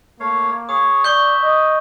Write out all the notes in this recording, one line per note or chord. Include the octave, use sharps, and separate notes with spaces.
A3 A#3 C#5 F5
G#4 C#5 D#6
D5 E5 C#6 G6
D#5